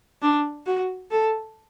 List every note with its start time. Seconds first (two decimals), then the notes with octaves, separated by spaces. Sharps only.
0.22 D4
0.66 F#4
1.11 A4